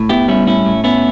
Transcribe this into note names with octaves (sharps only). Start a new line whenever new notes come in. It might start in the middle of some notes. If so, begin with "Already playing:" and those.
Already playing: A2
B3 E4 G4
G3 C#4 E4
A2 C#4 E4
A2
B3 C#4 E4